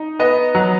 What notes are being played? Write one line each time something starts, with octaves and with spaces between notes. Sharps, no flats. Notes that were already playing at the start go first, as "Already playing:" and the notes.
Already playing: D#4
B3 D#5
F#3